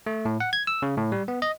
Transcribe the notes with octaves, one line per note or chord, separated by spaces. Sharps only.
A3
A2
F#5
G#6
E6
C#3
A2
G3
B3
D#5